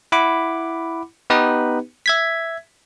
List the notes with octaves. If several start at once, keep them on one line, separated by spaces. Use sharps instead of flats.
E4 F#5 B5 D6
B3 D#4 G4 B4
E5 G#6 B6